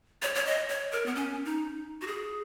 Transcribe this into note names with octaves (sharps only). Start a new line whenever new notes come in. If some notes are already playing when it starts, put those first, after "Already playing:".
C#5
C#5
D#5
C#5
A#4
B3
C#4
D#4
F#4
G#4